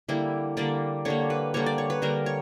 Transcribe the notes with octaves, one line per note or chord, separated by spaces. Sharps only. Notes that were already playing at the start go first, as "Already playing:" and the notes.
D3 G3 A#3 E4
D3 G3 A#3 D5
D3 G3 A#3 C#5
B4
D3 G3 A#3 C#5
D5
C#5
B4
D3 G3 A#3 A#4
C#5